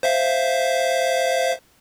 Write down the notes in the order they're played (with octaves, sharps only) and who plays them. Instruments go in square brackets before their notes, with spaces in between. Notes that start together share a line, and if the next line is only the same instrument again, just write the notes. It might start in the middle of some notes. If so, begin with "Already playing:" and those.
[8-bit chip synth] C5 E5 F5